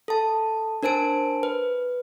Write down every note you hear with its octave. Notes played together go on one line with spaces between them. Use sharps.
A4 A5
D4 A#4 C5 A5 D7
B4